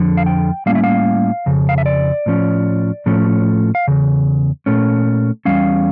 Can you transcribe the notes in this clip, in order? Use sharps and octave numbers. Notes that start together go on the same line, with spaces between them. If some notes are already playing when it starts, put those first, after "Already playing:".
Already playing: F2 D3 F3
F5
G5
A2 G3 A#3 C#4 F5
E5
F5
F2 C#3
F5
E5
D5
A2 F3 C#4
A2 F3 A3 C#4
F5
E2 C#3
A#2 A3 C#4
E2 E3 G3 C#4 F5